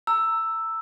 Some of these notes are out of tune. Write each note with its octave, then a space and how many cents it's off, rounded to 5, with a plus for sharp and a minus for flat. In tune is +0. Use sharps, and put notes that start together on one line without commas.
A#5 -20 E6 +0